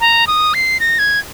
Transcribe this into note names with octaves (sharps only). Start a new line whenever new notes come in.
A#5
D#6
C7
A#6
G#6